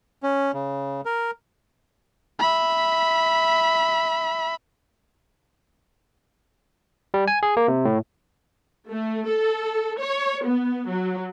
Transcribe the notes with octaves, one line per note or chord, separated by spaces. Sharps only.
C#4
C#3
A#4
E5 B5
G3
G#5
G#4
A#3
C3
A2
A3
A4
C#5
B3
F#3